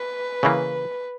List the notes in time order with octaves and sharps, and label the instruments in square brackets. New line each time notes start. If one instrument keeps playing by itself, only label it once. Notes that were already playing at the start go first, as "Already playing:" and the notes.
Already playing: [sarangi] B4
[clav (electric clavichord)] C#3 E3 A#3